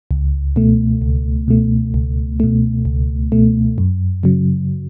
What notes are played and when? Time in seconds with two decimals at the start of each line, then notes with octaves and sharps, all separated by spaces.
0.11 C#2
0.56 B2 A3
1.02 C#2
1.48 B2 A3
1.94 C#2
2.40 B2 A3
2.85 C#2
3.32 B2 A3
3.78 F#2
4.23 C#3 F#3